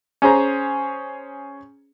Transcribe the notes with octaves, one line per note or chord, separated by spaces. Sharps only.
C#4 G#4 C5 A#5